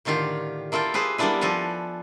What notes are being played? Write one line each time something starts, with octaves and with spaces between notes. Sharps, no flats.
A2 D3 D#3 F4 G4
A#3 E4 F4 A4 G5
G4 G#4 B4 C5
G3 A#3 B3 D4 E4 B4
F3 A4 B4 G#5